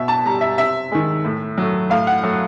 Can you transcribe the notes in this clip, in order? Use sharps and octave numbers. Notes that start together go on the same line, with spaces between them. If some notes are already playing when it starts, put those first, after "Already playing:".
Already playing: B2 E5
A5
G3 A#5
E5
C3 E5
D#3 G#3
A2
F#3 A3
A2 F5
F#5
F#3 A3